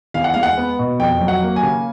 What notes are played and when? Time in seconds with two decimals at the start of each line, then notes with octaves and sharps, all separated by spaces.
0.14 E2 F5
0.24 F#5
0.34 G#3 F5
0.43 F#5
0.57 B3
0.79 B2
1.00 F2 G5
1.21 F#3
1.28 F#5
1.42 A#3
1.56 G#5
1.63 C#3